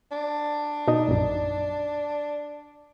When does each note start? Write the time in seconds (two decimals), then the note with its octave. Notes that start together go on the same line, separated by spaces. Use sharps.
0.12 D4
0.88 B2 D#4
1.08 A#1 F#2